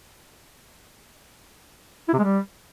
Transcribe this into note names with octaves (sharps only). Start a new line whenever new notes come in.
E4
C3
G#3
G3